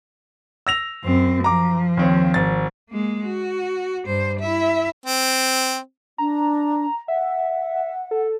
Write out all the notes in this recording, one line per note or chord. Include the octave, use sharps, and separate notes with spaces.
E6 A#6 F7
F#2 C4
F3 A#5 D6
D#2 C4 C#5
G#1 A6
G#3 A#3
F#4
G2 C5
E4 E5
C4
D4 A#5
E5 F#5
A4